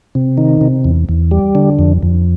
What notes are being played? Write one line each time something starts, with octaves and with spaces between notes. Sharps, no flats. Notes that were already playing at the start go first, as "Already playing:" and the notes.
C3
D#3
C3
E2
E2
G3
D3
F2
F2